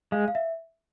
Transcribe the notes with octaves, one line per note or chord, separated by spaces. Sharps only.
G#3 F5
F5
E5